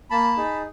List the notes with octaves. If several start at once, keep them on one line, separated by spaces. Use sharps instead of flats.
A#3 A5 B5
D#4 G#4